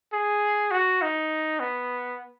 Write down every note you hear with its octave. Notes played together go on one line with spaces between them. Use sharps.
G#4
F#4
D#4
B3